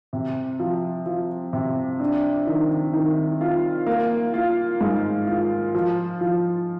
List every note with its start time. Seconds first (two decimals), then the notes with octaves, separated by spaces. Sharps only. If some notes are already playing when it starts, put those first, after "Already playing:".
0.13 C3
0.60 F3
1.06 F3
1.53 C3
2.00 D4
2.47 D#3
2.93 D#3
3.41 F4
3.86 A#3
4.34 F4
4.81 G#2
5.27 F4
5.75 F3
6.21 F3